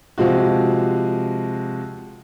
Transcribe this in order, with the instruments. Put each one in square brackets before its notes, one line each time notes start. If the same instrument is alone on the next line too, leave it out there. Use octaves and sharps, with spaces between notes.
[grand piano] C3 F3 G#3 F4 F#4